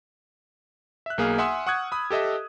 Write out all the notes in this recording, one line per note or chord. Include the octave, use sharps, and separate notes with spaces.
E5 F#6
B1 A#3 G#4 F5 F6
E5 F#5 G#5 C6 D#6 E6
F#5 C#6 D#6 F#6 G#6
B5 D#6
G4 A4 D#5 E5